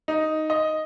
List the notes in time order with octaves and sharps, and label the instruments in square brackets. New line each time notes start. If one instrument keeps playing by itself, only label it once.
[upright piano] D#4
D#5